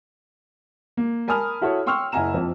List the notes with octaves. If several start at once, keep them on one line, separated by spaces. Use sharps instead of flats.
A#3
A#4 G#5 A5 B5 D#6 F6
E4 F#4 A4 C#5
G5 C6 C#6 E6 F6
F#1 E4 F#5 G#5 A#5 E7
F2 F3